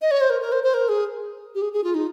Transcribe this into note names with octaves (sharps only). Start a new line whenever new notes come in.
D#5
C#5
C5
A#4
A#4
C5
C5
A#4
G#4
G4
G#4
G#4
F4
D#4